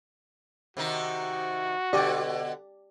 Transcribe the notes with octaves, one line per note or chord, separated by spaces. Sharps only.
C3 D#3 D#4 F#4
B2 D3 G4 D5 D#5